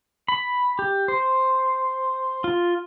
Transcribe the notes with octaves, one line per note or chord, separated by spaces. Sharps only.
B5
G4
C5
F4